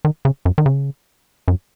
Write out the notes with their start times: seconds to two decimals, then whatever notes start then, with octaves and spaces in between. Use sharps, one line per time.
0.05 D#3
0.25 C#3
0.45 F#2
0.58 D#3
0.66 C#3
1.48 F#2